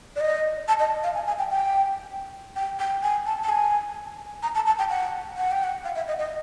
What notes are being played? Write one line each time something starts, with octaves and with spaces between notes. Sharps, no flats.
D5
D#5
A5
D#5
F5
G#5
G#5
G5
G5
G5
G5
G#5
A5
A5
G#5
A#5
A5
A5
G5
F#5
F#5
G5
F#5
F5
E5
D#5
D#5